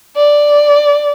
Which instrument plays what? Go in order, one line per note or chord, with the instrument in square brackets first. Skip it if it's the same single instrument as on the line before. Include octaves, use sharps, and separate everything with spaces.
[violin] D5